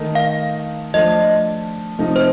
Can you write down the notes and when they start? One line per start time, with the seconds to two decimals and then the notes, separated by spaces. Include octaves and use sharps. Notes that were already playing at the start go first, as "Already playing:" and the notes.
Already playing: D#3 A3 D#4
0.15 F5
0.94 F3 A3 D4 D#5
1.99 C3 F3 A3 D#4
2.16 C5